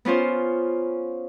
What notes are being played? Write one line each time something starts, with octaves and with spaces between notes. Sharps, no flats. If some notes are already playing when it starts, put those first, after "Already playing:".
B3 C#4 F4 C5